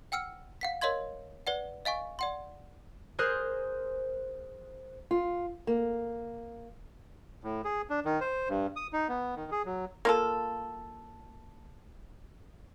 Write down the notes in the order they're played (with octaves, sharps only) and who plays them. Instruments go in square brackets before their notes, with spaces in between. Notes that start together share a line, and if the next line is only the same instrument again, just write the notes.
[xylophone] F#5 G5 E6 F6 C#7
F5 F#5 B6
A#4 C#5 D#5 F5 C6 G#6
B4 D5 F#5
D#5 F5 G#5 C#6
D5 F#5 C6
[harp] G#4 A#4 C5 F#6 G6
[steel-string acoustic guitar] F4
A#3
[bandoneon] A2
G#4
D4
D#3
C5
G2
D#6
D#4
B3
D#3
G#4
F#3
[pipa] A#3 F4 A4